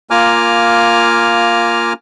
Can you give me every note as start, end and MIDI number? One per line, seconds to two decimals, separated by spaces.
0.10 1.93 58
0.10 1.93 65
0.10 1.93 80
0.10 1.93 82
0.10 1.93 86
0.10 1.93 89